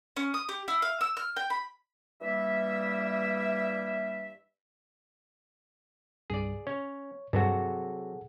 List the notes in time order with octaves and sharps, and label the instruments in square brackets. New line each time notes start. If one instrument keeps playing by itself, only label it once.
[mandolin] C#4
D#6
G4
E4
F5
E6
F6
G5
B5
[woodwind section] G2 E3 G3 A#3 E5
[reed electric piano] C2 G2 [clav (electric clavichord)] G#4 D5
[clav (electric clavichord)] C#4 [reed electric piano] C#5
[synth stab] G2 [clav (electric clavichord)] C3 F#3 F#4 [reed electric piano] G#4 A4 F#5